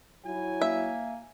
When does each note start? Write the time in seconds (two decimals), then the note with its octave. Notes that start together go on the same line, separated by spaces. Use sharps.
0.25 F#3 E4 G#5
0.62 A#3 E5